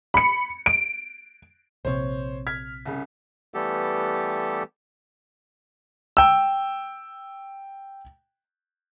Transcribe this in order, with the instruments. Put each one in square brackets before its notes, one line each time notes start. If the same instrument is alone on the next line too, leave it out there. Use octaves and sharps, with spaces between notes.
[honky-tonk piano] B5 C#7
D7
[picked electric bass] A#1 C3 [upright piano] C5 C#5
[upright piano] F6 G#6 B6
C2 C#3
[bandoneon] E3 G3 A3 B3 G4 A4
[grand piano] G5 E6